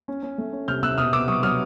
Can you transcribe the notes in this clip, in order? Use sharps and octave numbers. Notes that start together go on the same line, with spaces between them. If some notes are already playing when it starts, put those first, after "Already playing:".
C#4
C#4
A3
C#4
C3 F6 G6
C3 E6 F#6
B2 D#6 F6
B3 D6 E6
F#3 C#6 D#6
F#3 D#6 F6